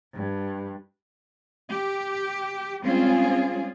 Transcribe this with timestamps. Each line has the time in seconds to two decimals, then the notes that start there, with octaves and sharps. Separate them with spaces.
0.13 G2
1.70 G4
2.82 G3 G#3 C4 C#4 F4 G#4